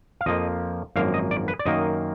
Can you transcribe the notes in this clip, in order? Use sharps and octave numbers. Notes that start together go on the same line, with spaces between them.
F5
F2 F3 A#3 D#5
G#1 F#2 F3 A#3 F5
D#5
D5
B4
D5
F#2 D#3 A#3 D#5